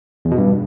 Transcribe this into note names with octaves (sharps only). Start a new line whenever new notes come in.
E2
B2
G2